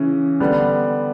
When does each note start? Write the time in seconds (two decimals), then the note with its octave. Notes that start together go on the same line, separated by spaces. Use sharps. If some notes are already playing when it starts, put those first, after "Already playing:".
Already playing: C#3 E3 C#4
0.40 D3 G3 B3